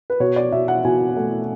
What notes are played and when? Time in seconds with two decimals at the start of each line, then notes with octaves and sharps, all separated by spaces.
0.10 B4
0.20 B2 C#5
0.36 D5
0.52 B2 E5
0.68 F#5
0.85 B2 G#5
1.17 A3